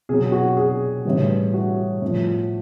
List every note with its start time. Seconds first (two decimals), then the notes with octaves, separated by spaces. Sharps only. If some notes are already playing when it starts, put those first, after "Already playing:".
0.09 B2 F#3 G#4
0.32 F#4
0.57 G#4
1.05 A2 E3 G3
1.54 F#4
2.02 A2 F3